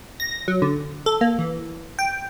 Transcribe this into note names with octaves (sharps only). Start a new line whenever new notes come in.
A#6
F#3
D3
A4
A#3
E3
G5